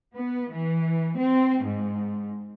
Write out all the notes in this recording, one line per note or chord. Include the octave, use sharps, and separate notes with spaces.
B3
E3
C4
G#2